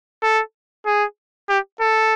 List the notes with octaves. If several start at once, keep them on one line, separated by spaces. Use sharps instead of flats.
A4
G#4
G4
A4